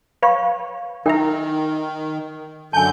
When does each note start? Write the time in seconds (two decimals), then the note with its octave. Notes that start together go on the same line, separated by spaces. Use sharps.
0.22 B4 C#5 F5 C#6
1.06 D#3 D#4 E4 A#4 G5 A#5
2.73 F#2 D3 G#5 A5 G6